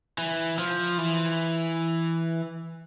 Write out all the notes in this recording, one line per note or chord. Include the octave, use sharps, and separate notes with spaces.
E3
F3
E3